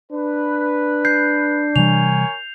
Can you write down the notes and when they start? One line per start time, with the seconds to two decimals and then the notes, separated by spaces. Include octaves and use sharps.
0.12 D4 B4
1.05 G6 C7
1.76 C3 E3 G3 A#4 C#5 G#5 F7